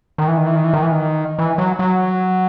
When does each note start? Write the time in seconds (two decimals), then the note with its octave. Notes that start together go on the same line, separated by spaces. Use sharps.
0.18 D#3
0.28 E3
0.37 D#3
0.47 E3
0.56 D#3
0.64 E3
0.74 D#3
0.83 E3
0.91 D#3
1.39 E3
1.58 F#3
1.79 F#3